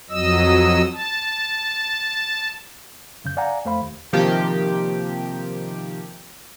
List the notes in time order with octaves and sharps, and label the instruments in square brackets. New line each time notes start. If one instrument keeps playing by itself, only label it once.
[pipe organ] F2 F#3 D#5 E6
A5
[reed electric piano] F#2 C#3 G6
D5 F5 F#5 G#5 A#5
F2 A3 C5 F5 B5
D#2
[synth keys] C3 D#3 F3 A#3 G4